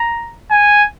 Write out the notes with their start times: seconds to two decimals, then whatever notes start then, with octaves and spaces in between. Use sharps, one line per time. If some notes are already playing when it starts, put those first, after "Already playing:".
Already playing: A#5
0.51 G#5